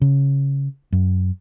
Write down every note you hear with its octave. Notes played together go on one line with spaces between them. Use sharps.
C#3
F#2